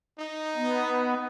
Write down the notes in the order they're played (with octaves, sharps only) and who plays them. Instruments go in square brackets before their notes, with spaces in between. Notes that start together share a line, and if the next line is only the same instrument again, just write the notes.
[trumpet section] D#4
[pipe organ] B3